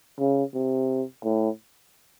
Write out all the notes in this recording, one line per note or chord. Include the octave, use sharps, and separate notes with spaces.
C#3
C3
A2